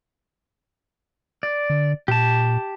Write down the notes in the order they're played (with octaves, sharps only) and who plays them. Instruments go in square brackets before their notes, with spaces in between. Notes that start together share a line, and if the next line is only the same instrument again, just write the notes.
[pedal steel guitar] D5
[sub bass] D3
[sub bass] A#2 [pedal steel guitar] G4 A5